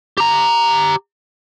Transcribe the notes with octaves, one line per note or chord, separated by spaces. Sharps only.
G4 A#5